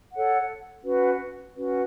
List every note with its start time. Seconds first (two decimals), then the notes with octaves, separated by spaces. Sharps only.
0.13 A4 C#5 F#5
0.84 C#4 F#4 B4
1.56 C#4 F#4 B4